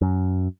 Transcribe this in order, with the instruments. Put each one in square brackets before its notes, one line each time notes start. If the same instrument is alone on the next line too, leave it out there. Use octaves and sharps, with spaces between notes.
[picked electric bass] F#2